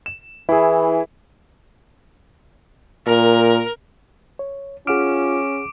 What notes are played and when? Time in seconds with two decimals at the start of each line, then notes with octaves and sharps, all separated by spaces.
0.06 E7
0.49 E3 E4 G#4
3.06 A#2 A#4
4.39 C#5
4.87 C#4 F4 G#4 F#5 D6 F6 D7